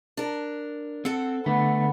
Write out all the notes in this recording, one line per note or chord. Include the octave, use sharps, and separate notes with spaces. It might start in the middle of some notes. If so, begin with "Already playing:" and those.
D4 A#4
C4 A4 F#5
D3 A3 B3